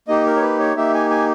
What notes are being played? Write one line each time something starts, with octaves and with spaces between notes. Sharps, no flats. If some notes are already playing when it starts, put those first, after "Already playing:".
A#3 D#4 G4 D#5
A#4
C#5
B4
C#5
A#3 D#4 G4 E5
G#5
G#5